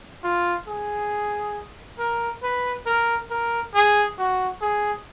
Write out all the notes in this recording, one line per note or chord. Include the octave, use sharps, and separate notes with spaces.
F4
G#4
A#4
B4
A#4
A#4
G#4
F#4
G#4